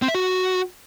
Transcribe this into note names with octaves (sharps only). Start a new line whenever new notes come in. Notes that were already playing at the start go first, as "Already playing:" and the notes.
C4
E5
F#4